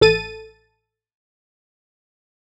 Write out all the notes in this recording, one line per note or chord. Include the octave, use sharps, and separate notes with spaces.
A1 A4 A6 D#7